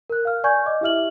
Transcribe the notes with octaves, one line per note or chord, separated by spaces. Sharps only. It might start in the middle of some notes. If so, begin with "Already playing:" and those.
A#4 F#6
F5 F6
D5 G#5 C#6 G6 G#6
D#5 D6
E4 G4 E5 F6 F#7